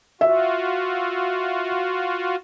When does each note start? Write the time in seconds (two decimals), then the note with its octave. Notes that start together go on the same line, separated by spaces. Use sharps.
0.21 F4 F#4 E5